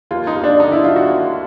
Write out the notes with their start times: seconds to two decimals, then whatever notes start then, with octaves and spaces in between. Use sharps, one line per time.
0.11 D#2 F4
0.27 D#4
0.35 D#2
0.44 D4
0.60 D3 D#4
0.72 E4
0.84 F#3 F4
0.96 F#4
1.08 D#2